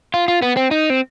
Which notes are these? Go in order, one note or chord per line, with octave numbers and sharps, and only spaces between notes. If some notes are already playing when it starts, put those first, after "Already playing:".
F4
F4
B3
C4
D#4
C4